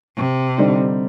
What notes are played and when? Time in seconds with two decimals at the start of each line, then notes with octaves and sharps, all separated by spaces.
0.17 C3
0.58 D3 G3 C4 D#4